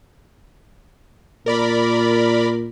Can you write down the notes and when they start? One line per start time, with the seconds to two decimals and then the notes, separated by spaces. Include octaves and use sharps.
1.46 A#2 A#4 D5 B5